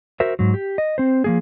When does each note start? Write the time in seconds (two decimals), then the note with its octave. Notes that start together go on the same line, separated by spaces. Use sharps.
0.20 F#4 A#4 C5 E5
0.39 G#2 F#3
0.54 G4
0.78 D#5
0.98 C4 C5
1.24 F3 A#3 G#4